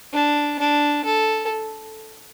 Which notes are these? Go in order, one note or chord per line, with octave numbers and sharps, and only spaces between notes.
D4
D4
A4